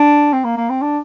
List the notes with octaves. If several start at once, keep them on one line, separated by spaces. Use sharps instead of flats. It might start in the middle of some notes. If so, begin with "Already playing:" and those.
Already playing: D4
C4
A#3
A#3
C4
D4